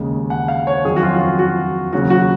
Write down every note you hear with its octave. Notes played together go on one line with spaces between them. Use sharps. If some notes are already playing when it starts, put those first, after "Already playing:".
Already playing: D#2 C#3 G#3
F#5
F5
C#5
F2 D#3 F#3 G#4
F#4
F4
F4
F#4
F#4
D#2 C#3 F#3 F#4
F#4